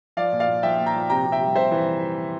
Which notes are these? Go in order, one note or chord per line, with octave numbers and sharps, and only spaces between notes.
F3 D5 F5
A#2
D5 F5
A#2
F3 E5 G5
A#2
G5 A#5
F3
C3 G5 A#5
C3
E5 G5
G3
C3 C5 E5
E3